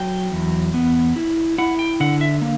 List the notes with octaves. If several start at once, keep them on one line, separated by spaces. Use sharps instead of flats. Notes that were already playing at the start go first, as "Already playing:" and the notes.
Already playing: F#3 G5
E2
B3
E4
E4 F#5
G5
D3 F#5
E5
A#3